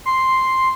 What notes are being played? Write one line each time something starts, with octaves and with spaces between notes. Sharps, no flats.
C6